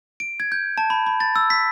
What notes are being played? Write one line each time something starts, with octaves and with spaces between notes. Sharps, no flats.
D7
G#6
G6
A5
B5
B5
A6
E6
B6